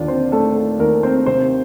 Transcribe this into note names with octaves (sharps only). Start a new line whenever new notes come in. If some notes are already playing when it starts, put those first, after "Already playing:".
Already playing: D#2 D3 D4 F4 D5
C4 C5
A3 A4
A4
D#2 A#3 A#4
C4 C5
C3 C4 C5